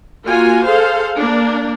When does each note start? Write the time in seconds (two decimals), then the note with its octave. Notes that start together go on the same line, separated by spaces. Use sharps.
0.25 A#3 F4 F#4 G#5
0.66 G#4 A4 C5 F5
1.17 A#3 D4